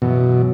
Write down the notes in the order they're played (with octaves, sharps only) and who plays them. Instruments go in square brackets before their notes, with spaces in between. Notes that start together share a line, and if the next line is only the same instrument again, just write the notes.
[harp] F#2 E3 B3 [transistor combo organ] B2